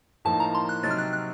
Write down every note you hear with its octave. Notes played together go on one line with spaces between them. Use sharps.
A2 F3 A#3 D#4 A5
A#5
C6
F#6
C3 F#3 C4 D#4 A6
F6
F#6
F#6